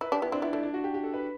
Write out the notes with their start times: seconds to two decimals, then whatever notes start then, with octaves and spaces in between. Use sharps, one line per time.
0.01 E4 B4
0.12 D4 G4
0.22 B3 E4
0.32 C4 D4
0.42 B3 E4
0.53 A3 D4
0.63 D4
0.74 F#4
0.84 G4
0.94 G4
1.04 A4
1.14 B4